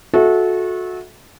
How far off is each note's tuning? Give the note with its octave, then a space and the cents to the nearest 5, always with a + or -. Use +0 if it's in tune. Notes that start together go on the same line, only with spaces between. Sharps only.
F#4 -25 A4 -25 E5 -20